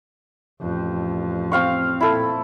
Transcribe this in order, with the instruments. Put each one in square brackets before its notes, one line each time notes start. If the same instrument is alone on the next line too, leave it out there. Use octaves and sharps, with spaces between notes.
[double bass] A1 F2
[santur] C4 F5 C#6
[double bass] A#2 [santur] E4 A4